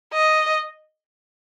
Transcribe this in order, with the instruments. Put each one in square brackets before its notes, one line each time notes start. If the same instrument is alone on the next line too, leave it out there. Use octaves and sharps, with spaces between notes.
[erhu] D#5